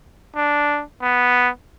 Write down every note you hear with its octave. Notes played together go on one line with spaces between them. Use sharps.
D4
B3